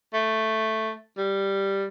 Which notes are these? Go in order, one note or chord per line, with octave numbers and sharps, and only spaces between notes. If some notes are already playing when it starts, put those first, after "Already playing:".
A3
G3